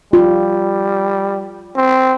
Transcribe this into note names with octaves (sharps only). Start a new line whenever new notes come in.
G3 F4
C4